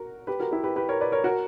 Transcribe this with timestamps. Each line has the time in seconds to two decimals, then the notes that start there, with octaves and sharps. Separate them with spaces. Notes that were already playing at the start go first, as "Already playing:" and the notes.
Already playing: F#4 A#4
0.27 G4 B4
0.40 F#4 A#4
0.51 E4 G4
0.64 G4 B4
0.76 G4 B4
0.89 A#4 C#5
1.01 B4 D5
1.12 A#4 C#5
1.24 F#4 A#4